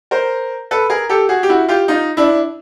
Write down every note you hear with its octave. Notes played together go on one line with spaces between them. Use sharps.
A#4 C5
A4 B4
G#4 A#4
G4 A4
F#4 G#4
G4
E4 F#4
F4 G4
D#4 F4
D4 E4